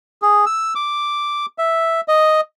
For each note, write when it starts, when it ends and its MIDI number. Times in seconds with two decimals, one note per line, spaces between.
0.22 0.45 68
0.46 0.74 88
0.75 1.46 86
1.58 2.01 76
2.08 2.41 75